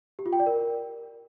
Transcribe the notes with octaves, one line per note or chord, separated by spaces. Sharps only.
G4
F4
G5
D5
A#4